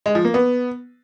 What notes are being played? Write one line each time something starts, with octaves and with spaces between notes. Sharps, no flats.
G#3
F3
A#3
B3